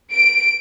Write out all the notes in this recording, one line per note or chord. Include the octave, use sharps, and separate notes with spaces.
D7